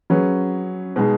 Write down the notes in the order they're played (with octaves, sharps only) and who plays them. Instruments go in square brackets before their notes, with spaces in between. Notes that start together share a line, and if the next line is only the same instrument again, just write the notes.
[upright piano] F#3 C#4 G#4 B4
B2 G#3 D#4 G#4